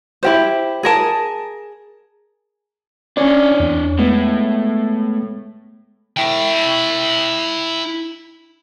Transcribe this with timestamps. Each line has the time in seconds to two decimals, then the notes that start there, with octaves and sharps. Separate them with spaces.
0.23 E4 G4 C5
0.83 G#4 A#4 A5
3.17 C#4 D4 C#5 D5
3.60 E2
3.98 A2 G#3 B3
6.17 E4 G5